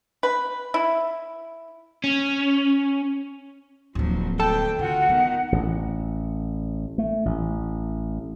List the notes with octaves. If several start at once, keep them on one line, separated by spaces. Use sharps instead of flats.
B4
E4
C#4
D1 F3 F#3 A#3
D2 A4 G5 A5
D3 F4 F#4 F#5
D#3 B3 F4
A1
A3
A1